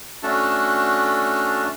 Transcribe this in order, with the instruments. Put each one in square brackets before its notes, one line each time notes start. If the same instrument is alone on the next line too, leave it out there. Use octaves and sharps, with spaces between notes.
[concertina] A3 C#4 D4 F#4 A4 A5